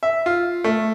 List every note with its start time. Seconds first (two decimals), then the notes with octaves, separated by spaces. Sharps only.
0.03 E5
0.26 F4
0.64 A3